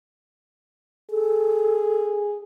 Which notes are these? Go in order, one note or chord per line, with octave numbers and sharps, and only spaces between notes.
G#4 A4